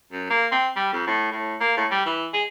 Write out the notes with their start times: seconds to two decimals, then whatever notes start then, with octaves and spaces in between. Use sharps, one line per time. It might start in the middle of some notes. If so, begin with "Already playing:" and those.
0.12 F#2
0.30 A#3
0.52 C4
0.76 G3
0.92 F2
1.07 A2
1.31 A2
1.60 A#3
1.77 A2
1.91 G3
2.05 E3
2.33 G#4